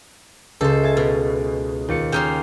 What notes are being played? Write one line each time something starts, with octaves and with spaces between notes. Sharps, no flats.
C#2 A4 C5
E5 G#5 A6
B2
D#2 F4 C#7
C#3 A#3 G5 G#5 C6